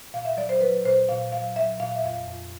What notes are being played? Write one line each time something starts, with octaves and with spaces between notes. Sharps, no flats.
A#2 F5
E5
F#3 D5
C5
F#3 B4
A#2 C5
A#2 F5
F#3 F5
F#3 E5
A#2 F5
E5
F2 F5
F2